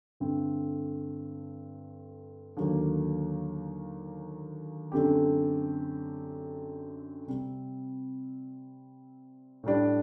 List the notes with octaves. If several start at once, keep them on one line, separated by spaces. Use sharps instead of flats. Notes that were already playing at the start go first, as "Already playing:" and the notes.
G2 D3 A3 C4
D#2 D3 F#3 A#3
F#2 D3 A3 C4 G4
C3 G3 C4
A2 G3 D4